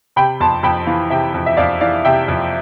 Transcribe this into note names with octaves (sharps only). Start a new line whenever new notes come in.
C3 G5 B5
F2 A5 C6
F2 G5 B5
E3 F5 A5
C3 E5 G5
F2
E5
F2 D5 F5
E3 D5 F5
C3 E5 G5
F2